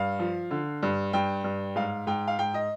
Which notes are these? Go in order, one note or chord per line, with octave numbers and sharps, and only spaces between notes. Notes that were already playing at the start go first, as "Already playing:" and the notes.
Already playing: G2 F5
F3
D3
G2
G2 G5
G2
G#2 F5
G#2 G5
F5
G#2 G5
D#5